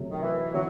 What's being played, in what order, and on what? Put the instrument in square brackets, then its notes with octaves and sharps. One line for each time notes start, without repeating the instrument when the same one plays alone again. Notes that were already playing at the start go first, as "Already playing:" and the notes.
Already playing: [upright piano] C3 F#3 A3
[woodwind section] D#3
E3
[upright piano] E3 E4 [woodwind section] F#3